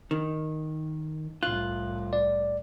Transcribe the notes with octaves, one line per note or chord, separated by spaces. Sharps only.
D#3
C2 A2 F4 F#6
D5